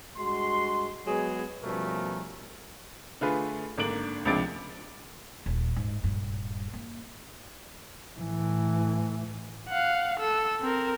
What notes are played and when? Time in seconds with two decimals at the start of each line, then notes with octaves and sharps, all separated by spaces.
0.18 G2 G#3 F#4 C6
1.07 F#3 G#3 B3 G#4
1.64 B2 F3 G3 A3 C#4 A#4
3.21 D3 A3 F4 G#4 B4
3.78 G#1 D3 A#3 D4 D7 F#7
4.25 C#2 C3 F3 D4 A6 D7
5.46 D#1
5.76 G#2
6.04 D#1 G2
6.73 A#3
8.20 A2 E3
9.69 F5 F#5
10.20 A4 E6
10.61 C4 A#4